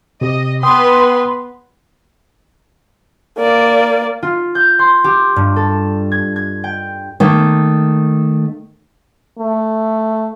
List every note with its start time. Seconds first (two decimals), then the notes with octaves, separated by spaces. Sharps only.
0.21 C3 G4 D#5
0.63 B3 B4 G5 C6 D#6
3.38 A#3 D5
4.23 F4
4.55 G6
4.79 C6
5.04 G4
5.36 G2
5.56 A4
6.12 G#6
6.36 G#6
6.64 G5
7.20 D#3 A3 A#3
9.39 A3